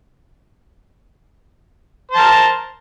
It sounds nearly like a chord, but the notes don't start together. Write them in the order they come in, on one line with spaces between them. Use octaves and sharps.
C5 A5 A#4